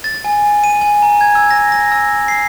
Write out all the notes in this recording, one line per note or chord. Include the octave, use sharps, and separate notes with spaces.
A6
G#5
D#7
G#5
A#5
G#6
E6
A#6
A#6
E6
C7